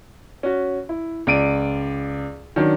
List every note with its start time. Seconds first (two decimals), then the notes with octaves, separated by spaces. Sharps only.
0.43 C#4 F#4
0.89 E4
1.27 C#2 D5 D7 D#7
2.56 D#3 F#3 C#4 D4